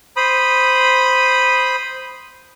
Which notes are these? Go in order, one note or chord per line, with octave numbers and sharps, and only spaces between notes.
C5 B5 D#6